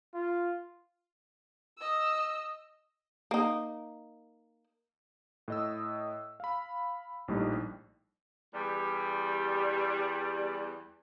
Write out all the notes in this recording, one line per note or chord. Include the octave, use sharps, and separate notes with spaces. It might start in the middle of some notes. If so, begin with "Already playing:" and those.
F4
D#5 E6
A#3 D#4
A2 D#5 E6
F5 B5
A#1 A2 G3 D#4 D#5
E2 G3